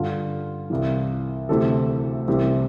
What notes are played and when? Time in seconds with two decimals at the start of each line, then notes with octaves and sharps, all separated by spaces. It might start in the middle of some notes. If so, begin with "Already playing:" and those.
Already playing: G2 D3 F4
0.70 C2 C3 E3
1.49 D2 C3 E3 A4
2.28 C2 C3 E3